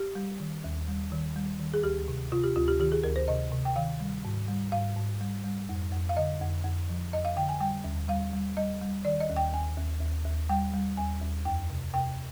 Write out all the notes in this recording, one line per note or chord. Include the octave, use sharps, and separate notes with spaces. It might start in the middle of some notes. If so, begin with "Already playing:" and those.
Already playing: G4
G3
D#3
D#2
G3
D#3
G3
D#3
G#4
D2 G4
C3
C3 F4
G4
D2 F4
G4
D#3 G4
G#4
D2 A#4
C5
C3 D#5
C3
G5
D#3 F5
G3
G#2
G3
G#2 F5
G#2
G3
G3
F2
F2
F5
D3 D#5
F2
F2
F3
F2 D#5
F5
D3 G5
G#5
G3 G5
D#2
G3 F5
G3
G3 D#5
G3
D#3 D5
D#5
D#2
G5
D#2 G#5
D#2
D#2
D#2
G3 G5
G3
D#2 G#5
D#2
F2 G5
C3
C3 G5